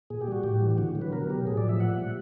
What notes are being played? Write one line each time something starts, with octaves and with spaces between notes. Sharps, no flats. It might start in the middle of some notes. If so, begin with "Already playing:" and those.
A#2 G#4
G4
G3 F#4
A2 G4
E3
G4
D3 F#4
F#3
B4
B2 A#4
F#3 G4
A2 G#4
D5
F3
E5
A#2 F#5
G3